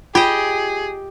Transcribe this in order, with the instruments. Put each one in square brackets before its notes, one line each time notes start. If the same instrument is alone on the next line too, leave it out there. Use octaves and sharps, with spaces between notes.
[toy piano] F4 [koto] G4 D#5 [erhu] G#4